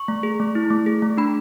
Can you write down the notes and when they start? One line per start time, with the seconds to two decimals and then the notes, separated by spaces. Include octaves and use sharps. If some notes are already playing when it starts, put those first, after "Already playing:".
Already playing: C#6
0.08 A3
0.23 G#4
0.40 A3
0.55 E4
0.70 A3
0.86 G#4
1.02 A3
1.17 D4 B5